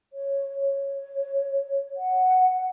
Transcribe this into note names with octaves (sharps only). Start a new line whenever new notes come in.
C#5
C#5
F#5